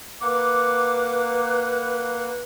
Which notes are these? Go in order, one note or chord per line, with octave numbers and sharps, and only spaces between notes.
A#3 B4 F#5 D6